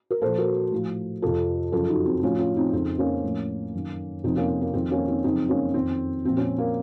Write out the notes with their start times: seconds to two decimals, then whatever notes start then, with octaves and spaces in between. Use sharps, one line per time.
0.11 A#4
0.21 A#2 F3 A4 C5
0.38 F#4 A#4
0.72 A2 F3
1.22 F2 C3 F3 F4 A4
1.72 F#2 C#3 F3 F4 A4
1.89 D#4 F#4
2.06 C4 D#4
2.23 A2 F3 C#4 F4
2.39 C#4 F4
2.56 C4 D#4
2.73 F2 C#3 F3 C4 D#4
2.99 A#3 C#4
3.24 A2 F3
3.74 F#2 D#3
4.24 F2 C3 F3 C4 D#4
4.36 A#3 C#4
4.49 A#3
4.61 A#3
4.73 F2 D#3 C4
4.91 A#3 C#4
5.08 C4 D#4
5.24 F#2 C#3 F3 C4 D#4
5.49 A#3 C#4
5.74 F2 D#3 C4
6.25 A#2 F3 C4
6.37 C#4
6.41 C4
6.58 A#3